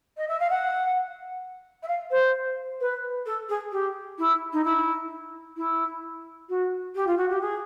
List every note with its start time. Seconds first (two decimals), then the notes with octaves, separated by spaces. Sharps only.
0.17 D#5
0.28 E5
0.40 F5
0.50 F#5
1.83 E5
1.88 F5
2.10 C5
2.80 B4
3.26 A4
3.49 G#4
3.72 G4
4.18 E4
4.53 D#4
4.64 E4
5.56 E4
6.49 F#4
6.95 G4
7.07 F4
7.17 F#4
7.29 G4
7.41 G#4